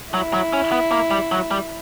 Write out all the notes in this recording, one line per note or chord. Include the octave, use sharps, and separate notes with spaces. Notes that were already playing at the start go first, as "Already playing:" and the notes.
F#3 E4
F#3
C#4
B3
A#3
G3
F#3
G3